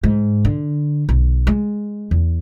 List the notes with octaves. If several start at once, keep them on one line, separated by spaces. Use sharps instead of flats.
G#2
D3
B1
G#3
E2